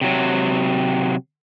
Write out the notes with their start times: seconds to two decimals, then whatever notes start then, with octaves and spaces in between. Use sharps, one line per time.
0.01 C3 F#3